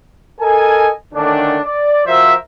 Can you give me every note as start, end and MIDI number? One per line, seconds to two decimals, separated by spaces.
0.41 0.90 69
0.41 0.90 70
0.41 0.90 75
0.41 0.90 80
1.14 1.58 50
1.14 1.58 51
1.14 1.58 57
1.14 1.58 61
1.14 1.58 62
1.64 2.04 74
2.06 2.33 53
2.06 2.33 66
2.06 2.33 70
2.06 2.33 72
2.06 2.33 76